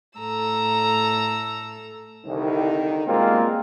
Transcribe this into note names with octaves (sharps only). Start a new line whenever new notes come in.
A2 A4 A#5 E6
C2 D3 D#3 D#4
B2 G3 G#3 A#3 C4 F4